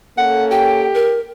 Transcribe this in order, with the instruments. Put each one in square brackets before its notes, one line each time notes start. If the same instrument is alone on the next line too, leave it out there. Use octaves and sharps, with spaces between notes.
[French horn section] A#3 C#4 A4 [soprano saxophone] F#5
[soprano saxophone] G4 [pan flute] G5
[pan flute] A#4